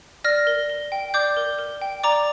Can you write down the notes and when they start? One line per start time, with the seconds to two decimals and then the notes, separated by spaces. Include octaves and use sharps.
0.24 D5 F6 A#6
0.47 A#4
0.70 A#4
0.92 G5
1.14 D5 D6 G6
1.37 A#4
1.59 A#4
1.81 G5
2.03 D5 A#5 D6